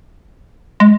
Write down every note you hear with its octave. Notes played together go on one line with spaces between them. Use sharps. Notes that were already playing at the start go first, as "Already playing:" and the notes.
G#3